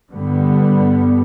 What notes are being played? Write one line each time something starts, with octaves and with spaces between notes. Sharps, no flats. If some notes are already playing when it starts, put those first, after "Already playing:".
G2 D3 G3 B3